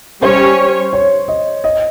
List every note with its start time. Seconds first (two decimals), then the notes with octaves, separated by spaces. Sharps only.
0.22 G3 C#4 G4 C5 C#5
0.93 C#5
1.28 D#5
1.64 D#5